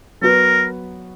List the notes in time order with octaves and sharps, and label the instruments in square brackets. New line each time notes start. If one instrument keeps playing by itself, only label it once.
[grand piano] F#3 B3 F#4 B4 [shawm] A#4